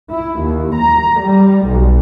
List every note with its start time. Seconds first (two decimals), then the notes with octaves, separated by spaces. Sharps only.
0.11 E4
0.40 D#2
0.75 A#5
1.20 G3
1.67 B1